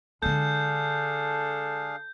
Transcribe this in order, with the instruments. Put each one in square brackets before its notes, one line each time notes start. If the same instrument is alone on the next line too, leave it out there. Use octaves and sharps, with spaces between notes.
[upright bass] D3 G#3 [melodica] D4 G#4 F5 [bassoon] A4 [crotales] G6